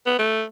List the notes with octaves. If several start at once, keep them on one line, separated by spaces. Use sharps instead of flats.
B3
A3